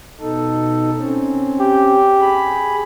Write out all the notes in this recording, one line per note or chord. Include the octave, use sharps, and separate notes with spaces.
B2 D#4 A4
C4 C#4
G4
G#4 B5